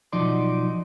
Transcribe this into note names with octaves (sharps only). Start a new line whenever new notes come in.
B1 F3 D#4 F#4 D5 C6